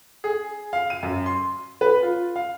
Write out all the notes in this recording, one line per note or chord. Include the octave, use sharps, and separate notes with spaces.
G#4
F5
D#7
F#2
C6
B4
F4
F5